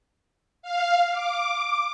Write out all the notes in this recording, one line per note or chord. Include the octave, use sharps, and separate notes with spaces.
F5
D6